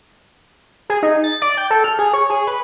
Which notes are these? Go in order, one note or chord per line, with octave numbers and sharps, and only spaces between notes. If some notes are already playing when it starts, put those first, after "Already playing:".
G#4
D#4
A6
D5
G5
A4
F6
G#4
C#5
G#4
B4